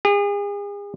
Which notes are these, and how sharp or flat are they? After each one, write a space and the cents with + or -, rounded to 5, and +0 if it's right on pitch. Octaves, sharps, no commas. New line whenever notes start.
G#4 -40